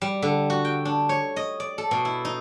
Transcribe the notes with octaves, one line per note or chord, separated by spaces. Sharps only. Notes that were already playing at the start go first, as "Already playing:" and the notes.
G3
D3
F#4
G5
D4
C#5
D#5
D5
A4
B2
E4
D#4